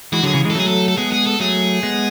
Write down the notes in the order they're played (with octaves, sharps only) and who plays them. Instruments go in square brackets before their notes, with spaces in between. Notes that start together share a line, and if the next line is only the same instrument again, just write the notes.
[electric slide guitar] E3 G#3 [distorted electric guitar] F#4
[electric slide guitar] D3 F#3 [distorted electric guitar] G#4
[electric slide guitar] C#3 E3
E3 G#3
[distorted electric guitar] A4
[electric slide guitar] F#3 A3 [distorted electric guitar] G#4
[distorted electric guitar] A4
A4
[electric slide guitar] G#3 B3 [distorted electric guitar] G#4
[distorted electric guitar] G#4
A4
[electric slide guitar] F#3 A3 [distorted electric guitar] G#4
[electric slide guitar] G#3 B3